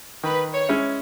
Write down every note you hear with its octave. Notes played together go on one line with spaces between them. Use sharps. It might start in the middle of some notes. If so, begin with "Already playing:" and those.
D#3 B4
C#5
G#3 C#4 E4